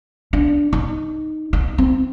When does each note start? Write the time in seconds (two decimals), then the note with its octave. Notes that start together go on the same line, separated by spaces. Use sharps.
0.33 D4
0.73 D#4
1.53 D#4
1.78 C4